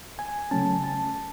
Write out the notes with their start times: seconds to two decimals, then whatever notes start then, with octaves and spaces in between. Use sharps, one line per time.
0.19 G#5
0.51 C#3 F#3 A3 C#4 A5
0.73 G#5
0.84 A5